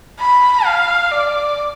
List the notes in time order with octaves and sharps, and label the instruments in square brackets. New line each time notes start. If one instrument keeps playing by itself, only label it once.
[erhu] B5
F5
D5